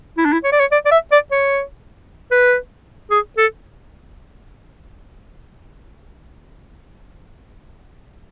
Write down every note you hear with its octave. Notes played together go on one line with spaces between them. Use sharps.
E4
D4
E4
C#5
D5
C#5
D5
D5
E5
D5
C#5
B4
G#4
A4